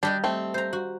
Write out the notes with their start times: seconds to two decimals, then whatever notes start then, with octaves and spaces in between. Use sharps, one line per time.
0.03 G3 D4 G4 D#5
0.24 A3 C4
0.54 C5 A#5
0.73 F#4